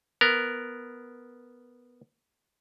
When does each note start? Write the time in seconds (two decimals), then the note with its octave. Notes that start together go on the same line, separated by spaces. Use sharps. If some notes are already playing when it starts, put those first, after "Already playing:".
0.21 B3 A#4